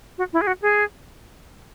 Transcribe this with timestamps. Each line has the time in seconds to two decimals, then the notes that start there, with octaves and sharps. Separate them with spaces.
0.18 F#4
0.33 E4
0.41 G#4
0.47 F#4
0.62 G#4